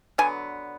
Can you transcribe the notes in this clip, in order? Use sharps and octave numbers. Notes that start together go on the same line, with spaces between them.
D3 F#3 B3 G#5